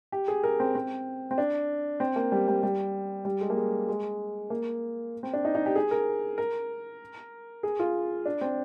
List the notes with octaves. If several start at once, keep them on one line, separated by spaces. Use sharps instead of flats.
G4
G#4
A#4
C4
C4
C4
D4
C4
A#3
G3
G3
G3
G3
G#3
A#3
G#3
G#3
A#3
C4
D4
D#4
D#4
G4
G#4
A#4
A#4
G#4
F4
D4
C4